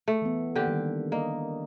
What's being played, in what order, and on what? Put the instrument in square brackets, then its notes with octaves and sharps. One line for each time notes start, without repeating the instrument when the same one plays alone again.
[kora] A3
[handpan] E3 B3
[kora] D3 G4 [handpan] A#3
[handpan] D#3 G3
[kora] A#3 [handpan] D5 D#5